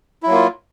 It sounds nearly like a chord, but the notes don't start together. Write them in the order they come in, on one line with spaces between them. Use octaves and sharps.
E4 F#3 A#3 F4